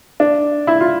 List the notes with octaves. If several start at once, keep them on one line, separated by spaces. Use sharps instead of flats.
D4
E4
F4